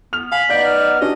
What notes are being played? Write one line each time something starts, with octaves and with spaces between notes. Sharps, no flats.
B3 F6 F7
F5 G#5 B5
B3 D#4 D5 F5 G6 D7
F6
C#4 D4 F#4 G4 D#5